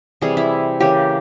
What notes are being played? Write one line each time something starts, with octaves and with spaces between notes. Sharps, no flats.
C3 E3 G3 G#4
E4
C#3 E3 A#3 G4